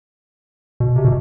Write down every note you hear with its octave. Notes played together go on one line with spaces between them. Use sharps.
B2
C3
B2